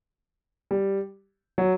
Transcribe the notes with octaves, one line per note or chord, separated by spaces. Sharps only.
G3
F#3